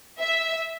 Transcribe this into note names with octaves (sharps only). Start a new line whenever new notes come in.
E5